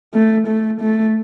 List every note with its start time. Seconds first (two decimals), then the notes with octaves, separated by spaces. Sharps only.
0.14 A3
0.47 A3
0.81 A3